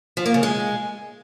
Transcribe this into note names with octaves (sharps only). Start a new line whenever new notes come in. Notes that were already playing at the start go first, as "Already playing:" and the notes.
F3
A#3
C#3
G#3